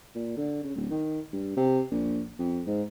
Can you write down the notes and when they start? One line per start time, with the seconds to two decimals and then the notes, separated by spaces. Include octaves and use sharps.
0.15 A#2
0.37 D3
0.63 C#3
0.75 D1
0.91 D#3
1.33 G2
1.56 C3
1.91 A#1
2.39 F2
2.66 G#2